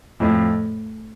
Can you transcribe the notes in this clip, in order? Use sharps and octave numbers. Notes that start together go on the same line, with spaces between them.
F2 A2